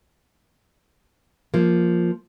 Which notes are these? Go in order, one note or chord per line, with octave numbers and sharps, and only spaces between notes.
F3 A#3